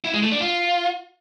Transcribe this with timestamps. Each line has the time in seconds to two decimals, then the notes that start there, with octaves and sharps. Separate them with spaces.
0.04 E4
0.13 G#3
0.23 A3
0.32 D4
0.41 F4